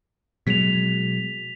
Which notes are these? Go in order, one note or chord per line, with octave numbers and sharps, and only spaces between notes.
B2 F#3 G#3 B6 F7